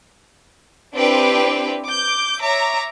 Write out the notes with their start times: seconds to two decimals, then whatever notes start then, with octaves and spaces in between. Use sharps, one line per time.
0.95 C4 D4 E4 G4 B4 D6
1.88 D6 G6
2.41 C#5 E5 A#5 D6